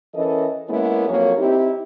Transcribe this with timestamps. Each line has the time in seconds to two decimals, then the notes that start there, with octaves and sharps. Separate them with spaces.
0.15 E3 C#4 A4 A#4 D#5
0.68 G#3 A#3 B3 C#4 E4 G#4
1.07 F2 F#3 A#3 C#5
1.37 C4 D#4 E4 G4